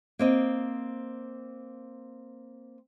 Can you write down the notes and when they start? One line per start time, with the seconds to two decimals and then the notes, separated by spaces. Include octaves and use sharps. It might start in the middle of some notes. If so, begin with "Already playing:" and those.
0.19 A#3 C4 D#5